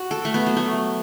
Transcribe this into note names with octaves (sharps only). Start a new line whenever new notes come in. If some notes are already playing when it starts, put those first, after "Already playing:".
Already playing: F#4
A4
A3
B3
F#3
A3